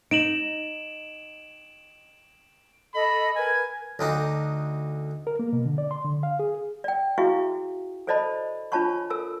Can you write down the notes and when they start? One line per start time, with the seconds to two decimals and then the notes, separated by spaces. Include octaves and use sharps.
0.11 D#4 D7 E7 F#7
2.94 A4 D#5 B5
3.36 A#4 B4 G#5 G#6
3.99 D2 D4 D#4
5.27 A#4
5.39 A#3
5.53 B2
5.66 D3
5.78 D5
5.91 C6
6.05 D3
6.23 F5
6.39 G#4
6.84 D5 G5
7.18 E4 F#4 G#4 E5 F5 C#6
8.07 A4 C5 D5 D#5 A5 B5
8.72 D4 F4 C#5 A5 B5 C#6
9.10 A4 A#4 E6